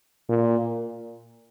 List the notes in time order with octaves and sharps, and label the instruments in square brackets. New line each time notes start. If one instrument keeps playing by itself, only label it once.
[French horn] A#2